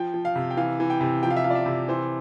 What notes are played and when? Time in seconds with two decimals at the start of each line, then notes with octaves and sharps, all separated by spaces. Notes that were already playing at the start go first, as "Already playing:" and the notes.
Already playing: F3 G5
0.14 F3
0.25 F5
0.36 C3
0.51 G5
0.57 E3 F5
0.80 E3
0.90 G5
1.01 C3
1.23 F3 G5
1.30 F5
1.37 E5
1.44 F3 F5
1.50 D5
1.55 E5
1.66 C3
1.88 E3 C5